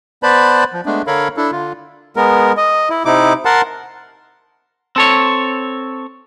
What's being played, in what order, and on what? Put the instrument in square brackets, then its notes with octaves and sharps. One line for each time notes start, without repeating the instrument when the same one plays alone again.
[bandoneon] B3 B4 C5 D5 A5 B5
F3
G#3 A3 B3 D4
D3 A4 A#4 C#5 F5 B5
D4 E4 A4
D3 F4
G#3 B3 A#4
D#5
E4
C3 D#4 E4 D6
A#4 F#5 A5 C6
[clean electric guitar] C4 A4 C#5